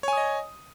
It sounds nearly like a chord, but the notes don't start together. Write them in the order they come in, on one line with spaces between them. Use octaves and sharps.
C#5 G#5 D#6 D#5